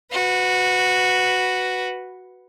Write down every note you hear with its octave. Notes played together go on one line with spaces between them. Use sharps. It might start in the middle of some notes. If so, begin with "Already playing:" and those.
F#4 B4